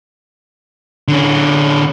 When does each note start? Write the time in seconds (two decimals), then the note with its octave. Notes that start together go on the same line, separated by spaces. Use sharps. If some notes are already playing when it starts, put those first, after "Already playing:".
1.08 D3 C#4